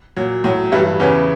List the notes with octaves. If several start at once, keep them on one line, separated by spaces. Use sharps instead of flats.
A#2 F#3
A2 F#3
G2 E3 G3 A3
E2 C#3 E3 B3 C#4